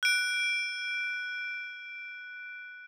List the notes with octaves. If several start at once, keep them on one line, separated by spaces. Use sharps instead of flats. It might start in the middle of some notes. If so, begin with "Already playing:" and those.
F#6 D7